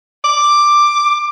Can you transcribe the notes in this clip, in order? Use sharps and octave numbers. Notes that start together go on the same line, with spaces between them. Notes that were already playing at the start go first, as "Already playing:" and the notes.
D6